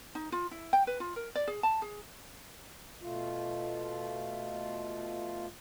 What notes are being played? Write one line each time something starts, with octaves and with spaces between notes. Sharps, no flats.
D#4
F4
E4
G5
B4
F4
A#4
D5
G#4
A5
G#4
B2 A3 F4